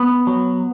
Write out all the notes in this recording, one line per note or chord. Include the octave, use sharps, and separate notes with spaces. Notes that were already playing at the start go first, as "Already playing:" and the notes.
Already playing: B3
F#3